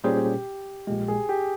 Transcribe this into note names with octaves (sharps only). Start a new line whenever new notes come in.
A#2 G3 C#4 G4 G#4 C5
A#1 A#2 G#3 G4
G#4
G4